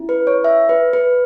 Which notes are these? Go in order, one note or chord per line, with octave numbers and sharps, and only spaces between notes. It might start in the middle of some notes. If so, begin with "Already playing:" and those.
Already playing: C#4 E4
B4
C#5
E5
B4
B4